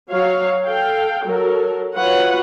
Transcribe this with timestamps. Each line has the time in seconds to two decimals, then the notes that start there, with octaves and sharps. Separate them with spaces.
0.10 F#3 C#5 F5
0.66 A4 F5 G5
1.25 F#3 A4 A#4
1.95 F#3 F4 B4 C#5 F#5